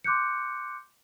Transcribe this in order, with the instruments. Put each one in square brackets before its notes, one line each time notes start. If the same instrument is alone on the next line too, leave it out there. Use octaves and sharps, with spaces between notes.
[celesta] C6 D6 F#6 G6 C#7